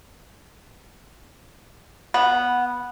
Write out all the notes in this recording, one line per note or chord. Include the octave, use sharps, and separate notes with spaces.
B3